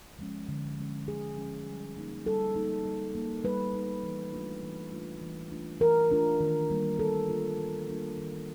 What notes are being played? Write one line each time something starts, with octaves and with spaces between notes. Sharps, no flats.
F3 G#3 C#4
D3
F3 G#3 C#4
D3 G#4
F3 G#3 C#4
G3
A#3 D#4
G3 A4
A#3 D#4
G3
A#3 D#4
G3 B4
A#3 D#4
E3
A3 D4 F4
E3
A3 D4 F4
E3
A3 D4 F4
E3 A#4
A3 D4 F4
D#3
G3 A#3 D4 F4
D#3 A4
G3 A#3 D4 F4
D#3
G3 A#3 D4 F4
D#3